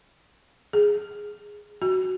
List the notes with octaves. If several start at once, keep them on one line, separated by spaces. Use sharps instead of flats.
G#4
F#4